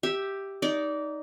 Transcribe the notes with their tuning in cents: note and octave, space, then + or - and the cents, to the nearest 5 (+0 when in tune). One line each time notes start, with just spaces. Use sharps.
G4 +0 E5 +0
D#4 +0 D5 -20